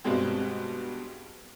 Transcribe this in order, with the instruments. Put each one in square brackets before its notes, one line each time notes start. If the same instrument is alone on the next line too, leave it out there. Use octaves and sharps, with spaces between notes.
[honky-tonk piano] G2 B2 G3 G#3 C4